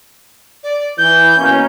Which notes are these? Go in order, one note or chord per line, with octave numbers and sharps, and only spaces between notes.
D5
E3 G6
B2 A#3 C#4